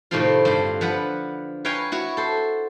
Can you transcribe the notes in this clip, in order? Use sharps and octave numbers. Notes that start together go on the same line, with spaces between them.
A2 C3 D#3 F3 C4 F4
G2 D3 C5
F3 B4 F#5
B4 C#5 F5 G5 G#5 A#5
E4 F#4 C#5
A4 C5